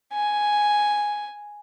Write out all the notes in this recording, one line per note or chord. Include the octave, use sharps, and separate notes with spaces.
G#5